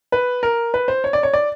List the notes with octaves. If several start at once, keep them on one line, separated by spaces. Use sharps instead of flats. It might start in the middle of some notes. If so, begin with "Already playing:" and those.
B4
A#4
B4
C5
C#5
D5
C#5
D5